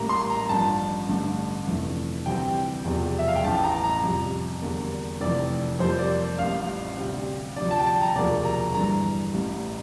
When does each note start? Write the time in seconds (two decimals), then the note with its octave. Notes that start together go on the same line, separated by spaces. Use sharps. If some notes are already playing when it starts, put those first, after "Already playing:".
Already playing: A1 A2 G3 A#3 A#5
0.09 C6
0.30 A#5
0.49 A1 G2 F3 A5
1.08 A1 G2 D3 A3
1.67 F1 F2 E3 A3
2.26 D2 C3 E3 G3 C4 G5
2.85 E1 E2 C3 F3
3.19 E5
3.28 F5
3.35 G5
3.44 A1 A2 E3 A5
3.64 A#5
3.84 A#5
4.03 F2 C3 G3
4.62 E2 D3 G3 A#3
5.20 F1 F2 E3 A3 C4 D5
5.79 F2 C3 G3 A#3 C5
5.99 D5
6.39 A1 A2 G3 F5
6.98 D2 C3 G3 C4
7.56 D2 C3 F3 D5
7.71 A5
7.79 G5
7.87 A5
8.01 A#5
8.16 E1 D2 C3 F3 A#3 D5
8.45 A#5
8.74 G1 G2 E3 A#5
9.33 A1 A2 G3